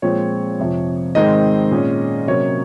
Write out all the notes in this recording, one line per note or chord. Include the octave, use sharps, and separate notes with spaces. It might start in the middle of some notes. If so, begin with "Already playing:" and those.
A#2 F3 G#3 C4 C#5
F2 C3 F3
G#2 D#3 G#3 C4 D#5
A#2 G#3 C#4
C3 F#3 A#3 C#4 C#5